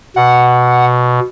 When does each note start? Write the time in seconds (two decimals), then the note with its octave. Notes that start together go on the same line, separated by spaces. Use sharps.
0.16 B2 F#5